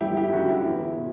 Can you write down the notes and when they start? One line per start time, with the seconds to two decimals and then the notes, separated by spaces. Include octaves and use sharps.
0.01 G1 E4 G4
0.17 E4 G4
0.33 F#2 D3 F#4
0.49 E4
0.65 E2 E4
0.97 B2